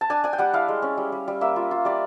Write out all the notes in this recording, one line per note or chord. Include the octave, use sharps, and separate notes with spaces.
A5
D4 G#5
D4 G#5
G5
G3 F#5
E4 F5
G#3
C#4
G3
G3
G3
A#3 E5
F4
F4
G3 D5